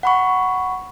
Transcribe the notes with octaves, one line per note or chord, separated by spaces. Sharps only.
F#5 B5 C#6